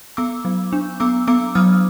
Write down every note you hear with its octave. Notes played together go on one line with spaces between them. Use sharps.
B3 D6 E6
F#3
D4
B3 D6 E6
B3 D6 E6
F#3 D#6 F6